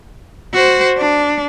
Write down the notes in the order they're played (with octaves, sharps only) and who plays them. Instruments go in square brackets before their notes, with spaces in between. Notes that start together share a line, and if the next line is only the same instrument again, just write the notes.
[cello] F#4 C5
D4